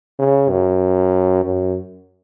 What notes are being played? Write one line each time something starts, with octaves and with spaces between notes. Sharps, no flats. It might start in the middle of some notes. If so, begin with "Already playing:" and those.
C#3
F#2
F#2